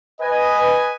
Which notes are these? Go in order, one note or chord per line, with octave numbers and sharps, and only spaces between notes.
B4 D#5 G#5